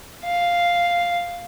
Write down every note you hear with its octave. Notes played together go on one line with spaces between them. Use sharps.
F5